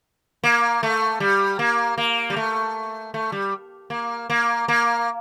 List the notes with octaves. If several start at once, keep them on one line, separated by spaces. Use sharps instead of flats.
A#3
A3
G3
A#3
A#3
G3
A3
A3
G3
A#3
A#3
A#3